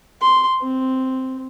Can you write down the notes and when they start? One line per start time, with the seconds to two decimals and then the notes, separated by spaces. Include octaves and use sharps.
0.21 C6
0.62 C4